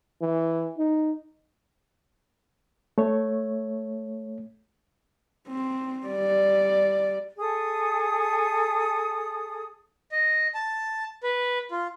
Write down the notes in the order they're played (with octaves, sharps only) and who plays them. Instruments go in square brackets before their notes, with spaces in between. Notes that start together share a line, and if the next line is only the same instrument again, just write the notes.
[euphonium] E3
D#4
[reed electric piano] A3 C#5
[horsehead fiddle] C4
G3 D5
[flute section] G#4 A4 D#6
[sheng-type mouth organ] D#5
A5
B4
F4